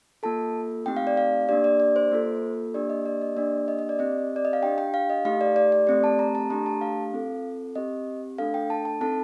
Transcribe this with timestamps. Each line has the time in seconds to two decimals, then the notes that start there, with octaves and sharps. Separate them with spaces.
0.23 A#3 F4 A4 A5
0.86 A3 C4 D#4 G4 G5
0.97 F5
1.07 D5
1.17 F5
1.49 A#3 D4 G4 D5
1.64 D5
1.80 D5
1.96 C5
2.12 A#3 F4 A4
2.74 A#3 D4 G4 D5
2.90 D#5
3.06 D5
3.22 D#5
3.36 A#3 D4 G4 D5
3.68 D#5
3.79 D#5
3.89 D5
3.99 C4 G4 D#5
4.36 D5
4.45 D#5
4.53 F5
4.62 D4 G4 G5
4.78 G5
4.94 F5
5.10 D#5
5.25 A3 D#4 G4 F5
5.41 D5
5.56 D5
5.72 D5
5.87 A3 C4 G4 D5
6.04 A5
6.19 A#5
6.35 A5
6.50 A3 D4 G4 A#5
6.66 A5
6.81 F5
7.14 C4 F4 A4
7.75 C4 G4 D#5
8.38 A3 D4 A4 F5
8.54 G5
8.70 A5
8.85 A5
9.01 C4 D#4 A4 A5